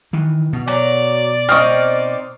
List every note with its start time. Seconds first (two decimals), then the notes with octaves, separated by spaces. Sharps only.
0.13 D#3 E3
0.53 B2
0.68 F#3 D5
1.49 C4 D#4 C#6 D#6 F6